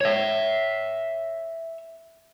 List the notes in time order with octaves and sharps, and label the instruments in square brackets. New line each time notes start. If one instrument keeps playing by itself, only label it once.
[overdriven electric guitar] C#5 E5